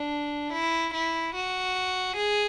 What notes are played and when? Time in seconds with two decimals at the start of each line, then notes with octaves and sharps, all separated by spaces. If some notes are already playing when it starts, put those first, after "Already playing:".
Already playing: D4
0.53 E4
0.94 E4
1.35 F#4
2.16 G#4